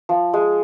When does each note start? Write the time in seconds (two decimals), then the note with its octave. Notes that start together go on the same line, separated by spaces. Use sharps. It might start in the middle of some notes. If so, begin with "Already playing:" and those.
0.09 F3
0.34 G#3